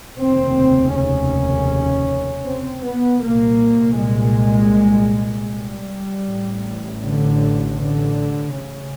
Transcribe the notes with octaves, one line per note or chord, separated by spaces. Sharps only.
F1 D#2 C#3 C4
C#4
C4
B3
C2 A#2 A#3
G#3
G3
A1 A2
D3
D3
C#3